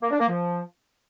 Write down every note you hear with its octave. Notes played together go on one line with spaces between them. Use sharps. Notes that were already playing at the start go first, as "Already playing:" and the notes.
A#3
D4
A#3
F3